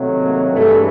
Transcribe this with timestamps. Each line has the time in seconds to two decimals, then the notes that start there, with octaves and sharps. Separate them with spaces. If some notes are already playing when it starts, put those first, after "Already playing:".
Already playing: C3 D#3 F#3 A3
0.19 A#3
0.52 G2 E3 G#3 A3